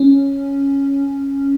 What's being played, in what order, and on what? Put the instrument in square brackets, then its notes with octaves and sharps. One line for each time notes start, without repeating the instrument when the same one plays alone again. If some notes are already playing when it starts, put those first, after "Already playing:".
Already playing: [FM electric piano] C#4